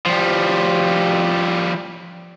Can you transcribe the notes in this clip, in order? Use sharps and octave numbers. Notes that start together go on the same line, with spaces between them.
F3 G3